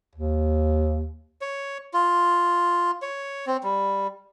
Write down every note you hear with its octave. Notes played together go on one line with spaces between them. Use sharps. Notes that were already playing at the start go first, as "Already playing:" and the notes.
D#2
C#5
F4
C#5
C4
G3